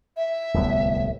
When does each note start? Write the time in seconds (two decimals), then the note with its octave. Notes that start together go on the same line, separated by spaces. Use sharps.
0.17 E5
0.54 D1 C2 B3